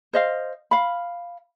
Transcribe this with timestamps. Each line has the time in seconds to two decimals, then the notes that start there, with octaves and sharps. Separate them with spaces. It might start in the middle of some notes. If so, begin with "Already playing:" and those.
0.13 C5 D#5 F5
0.71 F5 B5